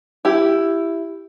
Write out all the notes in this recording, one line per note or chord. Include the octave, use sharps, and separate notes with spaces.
E4 G4